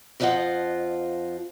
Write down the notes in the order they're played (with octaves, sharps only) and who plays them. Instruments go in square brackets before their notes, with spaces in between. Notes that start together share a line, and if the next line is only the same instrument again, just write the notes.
[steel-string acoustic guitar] F2 F3 D4 F4 D#5 F#5